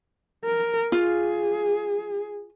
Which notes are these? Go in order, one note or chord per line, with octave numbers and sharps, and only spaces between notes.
A#4
F4 G#4